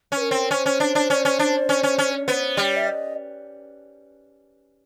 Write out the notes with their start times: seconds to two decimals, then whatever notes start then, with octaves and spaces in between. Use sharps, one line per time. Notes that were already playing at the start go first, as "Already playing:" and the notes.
0.12 C#4 B4
0.21 A#4
0.31 C4
0.50 C#4 C5
0.66 C#4
0.80 D4
0.95 D4
1.10 C#4
1.25 C#4
1.39 D4
1.69 C#4
1.83 C#4
1.98 C#4
2.16 C#5
2.28 B3 C5
2.57 G3 C#5
2.76 E5
2.87 D#5